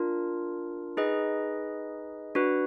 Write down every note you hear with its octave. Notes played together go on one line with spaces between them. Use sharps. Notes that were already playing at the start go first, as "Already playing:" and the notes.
Already playing: D4 F4 A#4
D#4 G#4 B4 D#5
D4 F#4 B4